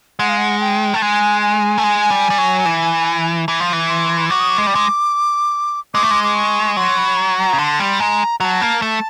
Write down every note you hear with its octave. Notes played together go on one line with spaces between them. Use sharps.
G#3 F#5
F5
F#5
G5
A3
G#3 G#5
G#5
A3
G#3
G3
G3
F#3
E3
E3
F3
E3
C6
F#3 D6
D#6
D6
G#3
G3
G#3
G#3 D6
A3
G#3
D6
C#6
F#3 C6
B5
A#5
A#5
C#3
D3 C6
G3
G#3 A#5
F#3 A5 A#5
A#3
A3 A5